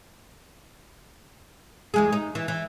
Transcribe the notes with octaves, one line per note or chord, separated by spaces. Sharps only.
E2 G#3 G#4
D#4
E3
E3